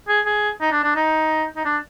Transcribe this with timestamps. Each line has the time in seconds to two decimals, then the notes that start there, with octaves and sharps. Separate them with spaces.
0.08 G#4
0.26 G#4
0.61 D#4
0.72 D4
0.84 D4
0.96 D#4
1.57 D#4
1.65 D4